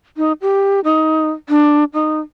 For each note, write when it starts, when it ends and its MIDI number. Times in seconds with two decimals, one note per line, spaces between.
0.17 0.32 63
0.42 0.80 67
0.84 1.31 63
1.49 1.84 62
1.94 2.20 63